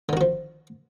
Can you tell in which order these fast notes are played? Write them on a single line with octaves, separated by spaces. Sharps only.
D3 D#3 F#4 F3